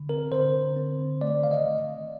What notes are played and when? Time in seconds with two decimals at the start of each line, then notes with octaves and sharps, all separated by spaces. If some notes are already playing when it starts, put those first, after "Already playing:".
Already playing: D3
0.09 C4 A#4
0.32 D3 C5
0.54 D3
0.76 C4
0.99 D3
1.21 A3 D5
1.43 D#3 F5
1.51 D#5